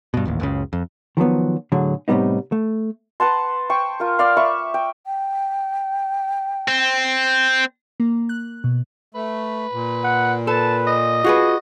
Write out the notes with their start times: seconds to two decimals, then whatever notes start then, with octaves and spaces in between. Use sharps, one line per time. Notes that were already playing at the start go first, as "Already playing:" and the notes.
0.14 G2 B2
0.25 D#1 A1 D#2
0.40 F#1 C#2 C#3
0.73 F2
1.17 D#3 F3 F#3 B3
1.72 A2 D3 F#3 G#4
2.08 A2 C3 D#3 G3 B3 D#4
2.52 A3
3.20 B4 F#5 A5 C6
3.70 C5 G5 C#6
4.00 F4 A#4
4.19 D5 F5 C6
4.37 E5 B5 C#6
4.74 G5
5.06 G5
6.68 C4
8.00 A#3
8.29 F#6
8.64 B2
9.15 A3 B4
9.73 A#2
10.04 F#5
10.47 A4 B4 A5
10.87 D#5
11.24 F4 F#4 G#4 B4